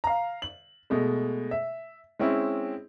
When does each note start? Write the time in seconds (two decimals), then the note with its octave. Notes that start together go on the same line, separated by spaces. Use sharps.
0.04 F5 A#5
0.42 F#7
0.90 B2 G#3 A3
1.51 E5
2.19 G#3 C4 C#4 E4